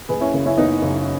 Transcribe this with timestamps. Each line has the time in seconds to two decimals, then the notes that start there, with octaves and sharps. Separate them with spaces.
0.09 F#1 G#4 B4
0.20 C#4 E4
0.34 F#2 C#3
0.46 C#4 E4
0.57 F#1 B3 D#4
0.82 F#2 C#3